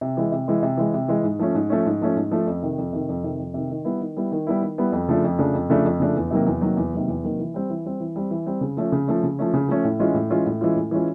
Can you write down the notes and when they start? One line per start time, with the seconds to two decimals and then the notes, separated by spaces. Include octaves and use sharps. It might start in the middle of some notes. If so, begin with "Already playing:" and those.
0.01 C3
0.17 E3 G#3
0.32 C3
0.48 E3 G#3
0.63 C3
0.77 E3 G#3
0.94 C3
1.08 E3 G#3
1.24 G#2
1.39 F3 A3 C#4
1.55 G#2
1.70 F3 A3 C#4
1.86 G#2
2.02 F3 A3 C#4
2.16 G#2
2.31 F3 A3 C#4
2.46 F2
2.62 C3 D#3
2.78 F2
2.93 C3 D#3
3.09 F2
3.23 C3 D#3
3.39 F2
3.54 C3 D#3
3.70 D#3
3.85 G3 B3 E4
4.01 D#3
4.17 G3 B3 E4
4.32 D#3
4.47 G3 B3 E4
4.62 D#3
4.78 G3 B3 E4
4.92 F2
5.09 C#3 F3 A3 D4
5.24 F2
5.39 C#3 F3 A3 D4
5.54 F2
5.70 C#3 F3 A3 D4
5.85 F2
6.00 C#3 F3 A3 D4
6.16 E2
6.31 C3 D#3 F#3 A#3
6.46 E2
6.61 C3 D#3 F#3 A#3
6.77 E2
6.93 C3 D#3 F#3 A#3
7.08 E2
7.24 C3 D#3 F#3 A#3
7.39 E3
7.54 G3 C4
7.70 E3
7.85 G3 C4
8.00 E3
8.16 G3 C4
8.31 E3
8.46 G3 C4
8.61 C#3
8.77 F3 A3 C#4
8.92 C#3
9.08 F3 A3 C#4
9.23 C#3
9.39 F3 A3 C#4
9.54 C#3
9.68 F3 A3 C#4
9.85 A2
10.00 E3 G#3 C#4 F4
10.14 A2
10.30 E3 G#3 C#4 F4
10.46 A2
10.61 E3 G#3 C#4 F4
10.76 A2
10.91 E3 G#3 C#4 F4